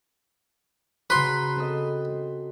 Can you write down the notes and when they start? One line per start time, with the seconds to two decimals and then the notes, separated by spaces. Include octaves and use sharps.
1.10 C#3 F#4 B4 A#5 C6
1.57 C4 A4 D#5